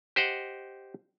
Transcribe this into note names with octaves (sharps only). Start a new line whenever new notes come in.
G4 C5 D#5 F#5